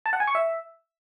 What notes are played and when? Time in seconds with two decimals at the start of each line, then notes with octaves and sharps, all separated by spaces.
0.06 A5
0.13 F#5
0.20 G#5
0.27 C#6
0.35 E5